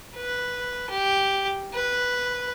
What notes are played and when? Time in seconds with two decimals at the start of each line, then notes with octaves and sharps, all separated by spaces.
0.15 B4
0.89 G4
1.74 B4